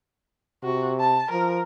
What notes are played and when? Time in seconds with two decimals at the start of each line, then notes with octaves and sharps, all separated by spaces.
0.63 C3 F#4
1.00 A5
1.31 F3 A#4